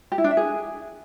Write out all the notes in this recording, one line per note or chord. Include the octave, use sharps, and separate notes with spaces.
G4
E4
D4
E5
G#4